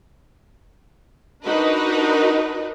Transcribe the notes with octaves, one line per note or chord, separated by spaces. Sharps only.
D4 D#4 F#4 A#4 B4 D#5